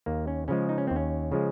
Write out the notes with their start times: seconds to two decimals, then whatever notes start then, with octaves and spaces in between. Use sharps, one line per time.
0.06 D#2 A#3
0.27 C#4
0.48 C#3 F3 G#3 C#4
0.69 D#4
0.78 C#4
0.87 D#2 C4
0.96 C#4
1.32 C#3 F3 G#3